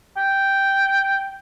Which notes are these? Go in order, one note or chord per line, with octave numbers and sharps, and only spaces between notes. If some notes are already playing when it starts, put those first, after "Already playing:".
G5